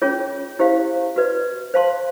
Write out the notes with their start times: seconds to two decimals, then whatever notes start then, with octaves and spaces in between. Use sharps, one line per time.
0.02 C#4 F4 G#4 C#5
0.59 E4 G4 C5 F5
1.16 F#4 B4 D5
1.74 C5 F5 A5 C6